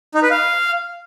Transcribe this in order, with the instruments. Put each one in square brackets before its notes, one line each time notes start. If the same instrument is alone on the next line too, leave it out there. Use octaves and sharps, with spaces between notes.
[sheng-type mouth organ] D#4
B4
F5